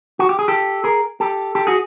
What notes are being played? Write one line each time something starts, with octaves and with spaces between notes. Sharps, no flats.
F#4
G4
G#4
G4 A4
G#4 A#4
G4 A4
G4 A4
F#4 G#4